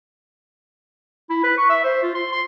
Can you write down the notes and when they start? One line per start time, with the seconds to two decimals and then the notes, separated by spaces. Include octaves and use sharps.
1.30 E4
1.43 B4
1.58 C#6
1.70 E5
1.84 C5
2.03 F4
2.15 C6
2.32 C6